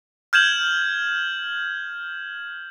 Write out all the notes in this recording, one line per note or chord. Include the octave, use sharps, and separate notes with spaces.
F6 G6 G#6 E7 F#7